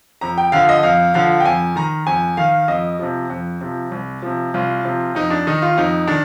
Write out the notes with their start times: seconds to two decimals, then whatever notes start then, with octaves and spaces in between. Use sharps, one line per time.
0.21 F2 A#5
0.38 G5
0.52 D3 F3 F5
0.69 D#5
0.83 F2 F5
1.14 D3 F3 F5
1.40 G5
1.45 F2 G#5
1.76 D#3 A#5
2.06 F2 G#5
2.37 D#3 F5
2.68 F2 D#5
2.99 C3 F3
3.30 F2
3.61 C3 F3
3.92 C2
4.22 C3 F3
4.54 C2 F4
4.85 C3 F3
5.15 F2 D#4
5.30 D4
5.47 D#3 D#4
5.62 F4
5.77 F2 D#4
6.07 D#3 D4